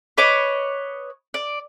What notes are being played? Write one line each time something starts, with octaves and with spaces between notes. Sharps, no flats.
B4 C#5 D#5 D6
D5